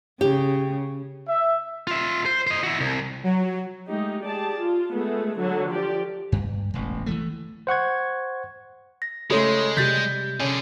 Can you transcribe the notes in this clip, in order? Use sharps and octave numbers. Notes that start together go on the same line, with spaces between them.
C#3 G4
E5
F4 E5
C5
C5 D#5
E4 F#4
C2
F#3
G#3 A3 D#4 G4
G4 G#4 D5 A5
F4
G#3 A3 B3 G#4
D3 F#3 F#4 A4
F3 G4 D5
G2
E1 A1
E3 F3 A3
C5 F#5 C#6 G#6
A#6
C#3 G#3 A3 A4 C#5 C6
C3 G3 G6 A6 B6
D3 C#4 G#4